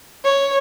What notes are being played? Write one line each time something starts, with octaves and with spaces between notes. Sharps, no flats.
C#5